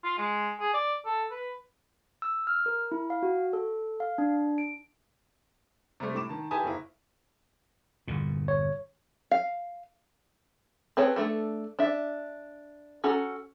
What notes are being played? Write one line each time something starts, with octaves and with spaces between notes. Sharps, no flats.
F4
G#3
G#4
D5
A4
B4
E6
F6
A#4
E4
F5
F#4
A4
F5
D4
D7
C3 G3 A3
A2 D6 E7
D#3 A5
E4 G4 B4 G#5 A5 D#6
F#1 A#3 E4
G1 E2 A#2
C#5
F5
C4 G#4 B4 C#5 A5
A3 D4 A4
D4 E5
C#4 F#4 A4 A#5